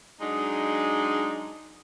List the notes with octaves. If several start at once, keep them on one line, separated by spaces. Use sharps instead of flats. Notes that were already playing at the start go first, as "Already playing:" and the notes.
F#3 G#3 D4 D#4